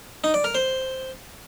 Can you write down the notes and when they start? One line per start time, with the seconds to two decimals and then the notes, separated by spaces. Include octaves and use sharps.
0.24 D#4
0.34 D5
0.44 A#4
0.55 C5